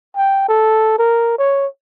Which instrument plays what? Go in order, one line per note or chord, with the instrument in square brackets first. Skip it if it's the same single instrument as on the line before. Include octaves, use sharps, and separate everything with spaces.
[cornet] G5
A4
A#4
C#5